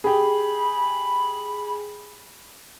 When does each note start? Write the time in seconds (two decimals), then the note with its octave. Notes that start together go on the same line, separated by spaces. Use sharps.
0.04 G4 G#4 B5